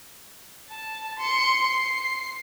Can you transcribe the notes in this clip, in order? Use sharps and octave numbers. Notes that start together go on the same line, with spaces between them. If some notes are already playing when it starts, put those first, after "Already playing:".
A5
C6 C#7
C7